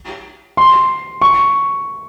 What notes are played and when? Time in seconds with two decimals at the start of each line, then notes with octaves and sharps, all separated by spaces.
0.57 C6
1.22 C#6